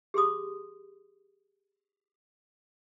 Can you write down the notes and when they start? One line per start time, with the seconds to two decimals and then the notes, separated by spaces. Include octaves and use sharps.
0.14 G4 G#4 C6 D#6